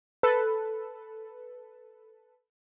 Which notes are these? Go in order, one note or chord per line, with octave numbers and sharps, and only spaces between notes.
A4 B4